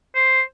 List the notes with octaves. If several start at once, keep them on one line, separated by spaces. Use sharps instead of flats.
C5